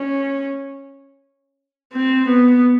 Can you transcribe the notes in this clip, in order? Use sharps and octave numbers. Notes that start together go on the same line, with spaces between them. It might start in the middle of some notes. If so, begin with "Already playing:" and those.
Already playing: C#4
C4
B3